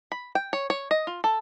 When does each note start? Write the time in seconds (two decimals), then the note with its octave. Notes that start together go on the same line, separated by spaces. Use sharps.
0.12 B5
0.35 G5
0.53 C#5
0.70 C#5
0.91 D#5
1.07 F4
1.24 A4